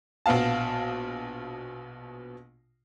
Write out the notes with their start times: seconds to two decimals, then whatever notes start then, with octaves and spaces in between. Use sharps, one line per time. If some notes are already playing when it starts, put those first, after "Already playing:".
0.26 A#1 B2 B3 F5 A5